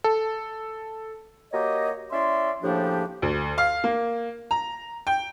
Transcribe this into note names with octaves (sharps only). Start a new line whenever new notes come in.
A4
A#3 F#4 G4 C#5 D#5
C#4 E4 D5 E5 C6
A2 C#3 F3 A#3 D4 G4
D2
F5
A#3
A#5
G5